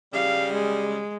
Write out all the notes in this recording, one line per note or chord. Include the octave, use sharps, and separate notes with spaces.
C#3 G3 F5
G#3